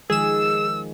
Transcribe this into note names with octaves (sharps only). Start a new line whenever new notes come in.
D#3 F3 G#3 G#4 E6 E7